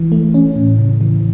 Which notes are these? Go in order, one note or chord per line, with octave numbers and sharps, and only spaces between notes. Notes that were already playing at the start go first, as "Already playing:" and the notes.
Already playing: E3
A3
C#4
A2
C#3
E3